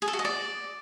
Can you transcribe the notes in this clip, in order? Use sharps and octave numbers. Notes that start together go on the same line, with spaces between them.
G#4
A4
F#4
D#5
D5